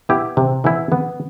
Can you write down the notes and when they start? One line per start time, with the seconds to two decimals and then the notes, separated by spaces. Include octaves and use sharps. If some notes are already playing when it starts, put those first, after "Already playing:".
0.09 B3 E4 G4
0.37 C3
0.64 E3 B3 E4
0.92 B3